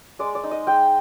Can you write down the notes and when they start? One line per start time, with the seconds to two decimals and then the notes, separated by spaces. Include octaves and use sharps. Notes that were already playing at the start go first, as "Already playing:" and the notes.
0.19 G#3 D5
0.35 D5
0.44 D#4
0.51 D#5
0.67 G#3 G5